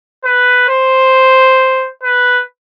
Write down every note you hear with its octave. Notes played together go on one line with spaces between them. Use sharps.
B4
C5
B4